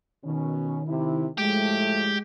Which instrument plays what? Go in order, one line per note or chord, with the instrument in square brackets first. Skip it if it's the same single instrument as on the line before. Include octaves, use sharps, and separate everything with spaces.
[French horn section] B2 C#4 [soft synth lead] D#3
[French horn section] C3 E4
[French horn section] A2 F3 A3 [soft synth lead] G#3 [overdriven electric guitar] G4